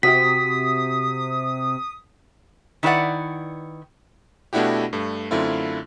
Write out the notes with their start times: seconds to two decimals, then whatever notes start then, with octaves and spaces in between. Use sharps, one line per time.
0.03 C3 F#4 G4 D#6 B6
2.83 D#3 E4 B4 D5 F#5
4.53 B2 A3 D4 E4 F#4 G4
4.93 G2 A3
5.31 F#2 D3 A3 C4 E4 F4